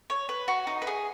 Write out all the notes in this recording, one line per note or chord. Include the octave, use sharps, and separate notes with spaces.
C#5
B4
F#4
D#4
B4
G#4